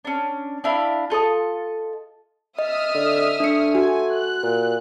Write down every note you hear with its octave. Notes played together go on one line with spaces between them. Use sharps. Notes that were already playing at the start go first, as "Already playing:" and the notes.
C#4 D4
D4 E4 F5 B5
F4 A4 D5 D#5
D#5 E5 D#6 F6
D3
A3 D4 C#7
F#4 G#5
F#6
A#2